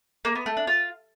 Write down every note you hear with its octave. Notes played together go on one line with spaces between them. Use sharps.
A#3
B3
A3
D4
F4